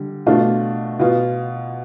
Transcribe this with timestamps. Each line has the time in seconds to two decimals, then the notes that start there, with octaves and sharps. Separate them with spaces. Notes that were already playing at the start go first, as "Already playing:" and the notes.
Already playing: D3 G3
0.26 B2 A3 D4 F4
0.99 B2 B3 F4